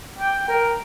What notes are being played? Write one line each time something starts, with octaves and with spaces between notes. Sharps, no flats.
G5
A#4